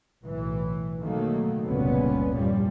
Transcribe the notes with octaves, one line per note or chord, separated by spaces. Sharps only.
B1 A2 E3
B2 D#3 F#3 A3 A#3
F1 C#2 A#2 G3 B3 C#4
E2 G2 A#2 F3 G3